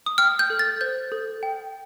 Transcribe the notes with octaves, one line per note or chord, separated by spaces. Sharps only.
D#6
G5 F6
G6
A4
A6
C5 G6
A4
G5